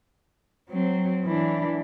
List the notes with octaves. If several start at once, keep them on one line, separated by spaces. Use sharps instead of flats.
F#3 C4
E3 D4